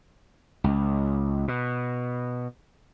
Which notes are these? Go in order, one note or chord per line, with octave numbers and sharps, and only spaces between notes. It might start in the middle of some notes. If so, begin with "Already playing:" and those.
C#2
B2